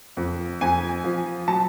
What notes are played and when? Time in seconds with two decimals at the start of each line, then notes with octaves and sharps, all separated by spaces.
0.17 F2
0.61 F2 G#5
1.04 F3
1.48 F#3 A5